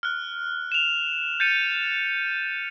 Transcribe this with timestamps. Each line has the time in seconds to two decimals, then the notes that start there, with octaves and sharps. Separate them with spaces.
0.03 F6 F#6
0.72 E7 F7
1.40 G6 A6 C#7 D#7